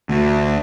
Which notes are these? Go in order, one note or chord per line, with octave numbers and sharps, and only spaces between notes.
D2